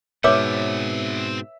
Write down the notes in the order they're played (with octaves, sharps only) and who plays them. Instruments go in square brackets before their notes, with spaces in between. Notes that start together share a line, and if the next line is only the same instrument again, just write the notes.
[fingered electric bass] G#2 B2 [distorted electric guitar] C4 F#5 [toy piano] B4 C#5 D6 [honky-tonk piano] E5